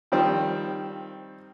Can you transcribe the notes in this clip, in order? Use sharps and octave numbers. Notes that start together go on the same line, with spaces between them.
D#3 F3 G3 C4